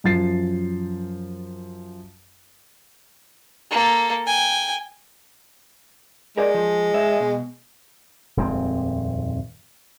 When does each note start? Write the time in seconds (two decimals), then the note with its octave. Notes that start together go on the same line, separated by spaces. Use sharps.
0.04 F#2 F3 A6 C7
3.70 A#3 A4
4.26 G5 G#5
6.38 G#3 A#4 D5
6.54 F3
6.94 G#2 C#5 E5
7.20 B2
8.37 D#1 F2 G#3 C4